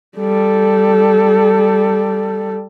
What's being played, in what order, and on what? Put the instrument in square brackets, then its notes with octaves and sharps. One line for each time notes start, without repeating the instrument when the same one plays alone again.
[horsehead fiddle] G3 A4